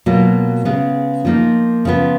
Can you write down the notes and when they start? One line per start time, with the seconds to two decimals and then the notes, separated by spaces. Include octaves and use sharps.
0.06 B2 F#3 A#3 F4
0.65 C#3 G#3 B3
1.25 F3 A#3 D#4
1.85 C#3 F3 B3